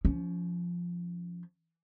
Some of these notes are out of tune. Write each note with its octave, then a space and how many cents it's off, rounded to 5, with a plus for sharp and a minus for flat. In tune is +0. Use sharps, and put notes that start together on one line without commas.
F3 +0 C#4 +30